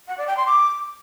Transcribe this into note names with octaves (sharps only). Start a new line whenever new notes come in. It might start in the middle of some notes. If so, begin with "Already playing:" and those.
F#5
D5
G5
C6
D6